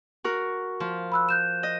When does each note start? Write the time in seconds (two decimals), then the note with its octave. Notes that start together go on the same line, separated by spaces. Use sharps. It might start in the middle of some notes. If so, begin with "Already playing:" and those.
0.24 F#4 A#4
0.80 F3
1.12 B5 E6 F#6
1.29 F#6 G6 E7
1.63 D#5